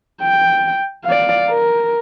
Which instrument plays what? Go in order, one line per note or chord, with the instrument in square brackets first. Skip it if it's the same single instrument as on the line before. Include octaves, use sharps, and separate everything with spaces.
[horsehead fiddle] G5
D5 F5
A#4